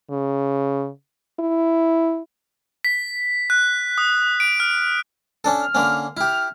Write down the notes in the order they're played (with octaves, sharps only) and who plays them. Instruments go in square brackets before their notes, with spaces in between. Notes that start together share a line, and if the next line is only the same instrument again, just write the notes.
[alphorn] C#3
E4
[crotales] B6
F#6
D#6
D7
F6
[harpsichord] C#4 D4 A4
[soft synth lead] F6
[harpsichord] D3 A#3 C#4
[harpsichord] E4 G4 [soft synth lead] F6